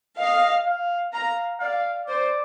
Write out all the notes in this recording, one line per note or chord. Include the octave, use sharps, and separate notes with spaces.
D#5 F5
F5
F5 A#5
D5 F5
C5 D5